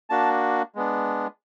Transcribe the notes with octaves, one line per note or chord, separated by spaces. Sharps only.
A#3 D4 F#4 A5
G#3 B3 D4